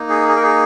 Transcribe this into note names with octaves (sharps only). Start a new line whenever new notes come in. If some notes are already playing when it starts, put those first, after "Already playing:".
Already playing: A#3 D#4
G#4
G#4
A#4
G#4